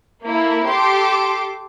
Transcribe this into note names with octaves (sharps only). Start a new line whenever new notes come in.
A#3 E4 A4
G4 A4 C6 D6